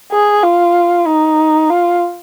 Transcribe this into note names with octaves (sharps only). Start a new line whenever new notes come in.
G#4
F4
D#4
F4